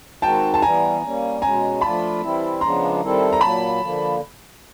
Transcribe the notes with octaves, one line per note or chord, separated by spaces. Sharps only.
D#3 G#3 C4 D#4 F#4 G5 A5
A5
E3 G3 B3 G#5 A#5
G3 A#3 C#4
B2 G#3 C#4 G#5 A#5
F3 A3 D4 F4 A5 B5
E3 G3 C4 E4
C#3 F3 G#3 B3 D4 A#5 C6
D#3 G3 C4 E4 A4
A#5
A#2 F#3 A#3 A5 B5
D3 F3 A#3